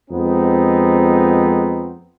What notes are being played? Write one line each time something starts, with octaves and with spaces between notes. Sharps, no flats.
F2 G#3 B3 C4 D#4